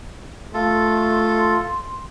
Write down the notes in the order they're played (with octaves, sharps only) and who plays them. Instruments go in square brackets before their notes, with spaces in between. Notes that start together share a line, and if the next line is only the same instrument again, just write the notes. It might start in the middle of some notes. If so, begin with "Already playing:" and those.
[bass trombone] A3 [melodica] F4 A4 [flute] C6